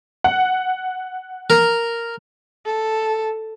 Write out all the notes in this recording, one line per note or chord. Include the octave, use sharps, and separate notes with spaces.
F#5
A#4
A4